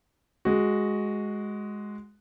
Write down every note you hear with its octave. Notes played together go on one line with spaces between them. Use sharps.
G#3 F#4